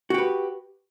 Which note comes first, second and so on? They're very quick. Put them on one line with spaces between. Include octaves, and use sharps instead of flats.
F#4 G4 B4